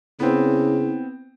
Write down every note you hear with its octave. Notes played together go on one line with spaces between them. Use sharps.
C#3 B3 C4 E4